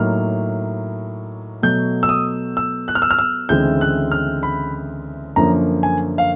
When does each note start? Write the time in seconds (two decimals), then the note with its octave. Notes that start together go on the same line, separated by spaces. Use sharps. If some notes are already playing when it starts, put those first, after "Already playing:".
Already playing: A2 F#3 A#3 D#4 F6
1.63 B2 F#3 A3 G6
2.03 E6
2.09 D#6
2.57 E6
2.88 F#6
2.95 F6
3.02 E6
3.11 F6
3.19 E6
3.49 D2 C#3 E3 G#3 C4 G6
3.81 F#6
4.12 F6
4.43 B5
5.36 F#2 D3 F3 A#3 C#4 A#5
5.83 G#5
6.18 F5